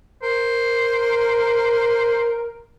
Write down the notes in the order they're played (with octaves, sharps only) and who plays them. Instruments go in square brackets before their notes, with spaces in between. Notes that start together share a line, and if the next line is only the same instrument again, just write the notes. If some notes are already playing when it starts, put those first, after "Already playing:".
[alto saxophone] A#4 [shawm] C5